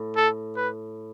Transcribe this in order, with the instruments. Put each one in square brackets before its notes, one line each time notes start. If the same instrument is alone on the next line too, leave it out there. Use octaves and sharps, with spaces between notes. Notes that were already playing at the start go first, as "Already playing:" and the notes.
Already playing: [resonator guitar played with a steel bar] A2
[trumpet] A4
B4